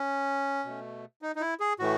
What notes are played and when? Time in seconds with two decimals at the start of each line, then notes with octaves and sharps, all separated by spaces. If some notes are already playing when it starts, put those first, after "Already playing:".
Already playing: C#4
0.65 B2 A3
1.22 D#4
1.36 D#4
1.41 E4
1.60 G#4
1.79 A2 E3 A3 F#4